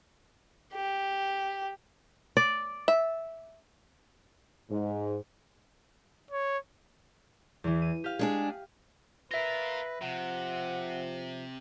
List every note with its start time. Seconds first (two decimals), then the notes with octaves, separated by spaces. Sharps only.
0.73 G4
2.37 D5
2.88 E5
4.70 G#2
6.31 C#5
7.64 E2 E3
7.82 D#7
8.04 G4 F5
8.19 G#3 D4 G#4
9.31 F4 A#4 B4 E5 A#6
10.02 C3 F3 F#5